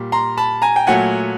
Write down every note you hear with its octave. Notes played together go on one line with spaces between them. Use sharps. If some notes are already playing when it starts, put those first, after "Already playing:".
Already playing: A#2 G3
A#5 C6
A5 B5
G#5 A#5
G5
A#2 F#3 A3 F#5 G#5